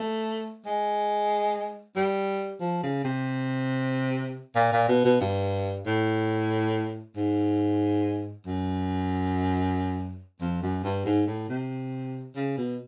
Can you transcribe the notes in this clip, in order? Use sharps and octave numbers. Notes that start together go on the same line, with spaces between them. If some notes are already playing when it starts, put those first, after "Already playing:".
Already playing: A3
G#3
G3
F3
C#3
C3
A#2
A#2
B2
B2
G2
A2
G#2
F#2
F2
F#2
G2
G#2
A2
C3
C#3
B2